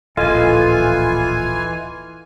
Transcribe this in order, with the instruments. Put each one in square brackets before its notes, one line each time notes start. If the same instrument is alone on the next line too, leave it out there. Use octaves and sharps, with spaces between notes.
[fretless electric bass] D1 A#1 [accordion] E3 G#5 [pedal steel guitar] F4 [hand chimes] A4 D#5